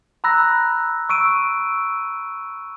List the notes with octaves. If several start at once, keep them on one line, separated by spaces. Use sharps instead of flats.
A#5 B5 E6 F#6 A#6
C#6 E6 D7 D#7